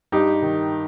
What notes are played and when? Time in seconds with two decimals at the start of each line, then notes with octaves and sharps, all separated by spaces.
0.12 G2 D#4 G4
0.42 D#3